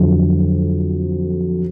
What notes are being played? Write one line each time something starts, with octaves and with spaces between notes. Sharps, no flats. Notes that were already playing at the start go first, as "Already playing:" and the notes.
Already playing: F2 D3 F#3